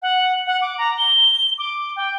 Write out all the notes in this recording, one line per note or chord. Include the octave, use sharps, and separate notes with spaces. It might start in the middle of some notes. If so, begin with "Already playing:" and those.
F#5
F#5
D6
A#5
G7
D6
G5